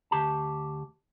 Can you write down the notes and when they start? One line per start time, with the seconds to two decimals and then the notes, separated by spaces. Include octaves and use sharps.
0.11 D2 G4 A5